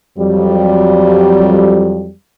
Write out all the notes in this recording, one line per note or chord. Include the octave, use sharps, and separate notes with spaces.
F2 F#3 G3